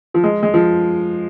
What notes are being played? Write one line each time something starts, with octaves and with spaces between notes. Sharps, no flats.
F3
G#3
G#3
F3